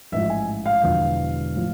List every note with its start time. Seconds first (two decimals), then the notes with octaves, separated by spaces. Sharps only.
0.12 A1 G#2 F3 E5
0.30 G#5
0.66 F5
0.83 E1 E2 D3 F3
1.56 A2 F3